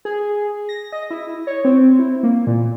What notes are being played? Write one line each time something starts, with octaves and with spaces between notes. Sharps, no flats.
G#4
A#6
D#5
E4
C#5
C4
E4
A#3
A#2